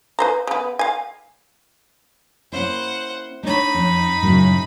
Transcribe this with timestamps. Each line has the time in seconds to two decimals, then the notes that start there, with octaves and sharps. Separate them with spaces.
0.19 B4 C5 A#5
0.47 C#3 B3
0.79 F5 G#5
2.52 A#3 C#4 E4 C5 F#5
3.43 A3 D4 D#4 C#5 B5
3.75 F2 C#4
4.23 F#2 A2 C#3